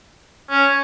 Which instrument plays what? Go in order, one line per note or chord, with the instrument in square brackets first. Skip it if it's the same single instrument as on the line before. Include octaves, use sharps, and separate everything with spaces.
[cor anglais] C#4